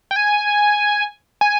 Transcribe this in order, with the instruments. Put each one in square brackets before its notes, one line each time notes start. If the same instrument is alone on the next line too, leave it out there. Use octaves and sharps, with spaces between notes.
[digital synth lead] G5
G#5
G#5